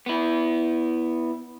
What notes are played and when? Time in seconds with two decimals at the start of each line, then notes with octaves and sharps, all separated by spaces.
0.06 B3 E4